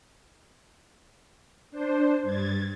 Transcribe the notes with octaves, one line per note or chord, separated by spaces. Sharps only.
D4 C5
G2 G#6 A6